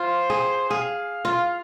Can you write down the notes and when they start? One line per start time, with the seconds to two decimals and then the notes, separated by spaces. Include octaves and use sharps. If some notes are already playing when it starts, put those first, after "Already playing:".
Already playing: F4 C5
0.30 G#4
0.70 G#4 F5
1.25 F4